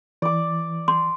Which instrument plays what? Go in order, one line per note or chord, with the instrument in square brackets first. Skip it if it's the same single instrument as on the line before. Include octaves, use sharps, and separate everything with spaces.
[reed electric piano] E3 [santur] D5 D6
[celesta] C6